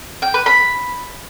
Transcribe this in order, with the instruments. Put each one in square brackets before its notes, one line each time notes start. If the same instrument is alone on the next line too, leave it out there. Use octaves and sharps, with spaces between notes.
[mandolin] G5
B4
B5